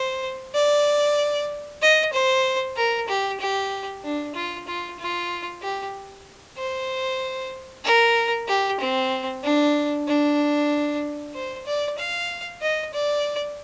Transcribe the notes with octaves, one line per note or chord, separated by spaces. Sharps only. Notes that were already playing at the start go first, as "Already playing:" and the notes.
Already playing: C5
D5
D#5
C5
A#4
G4
G4
D4
F4
F4
F4
G4
C5
A#4
G4
C4
D4
D4
C5
D5
F5
D#5
D5